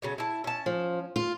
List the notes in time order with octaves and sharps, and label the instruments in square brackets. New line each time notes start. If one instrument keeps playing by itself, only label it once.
[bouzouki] C#3 F#3 A3
E4 A5
C#4 A5
[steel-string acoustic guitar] F3
F4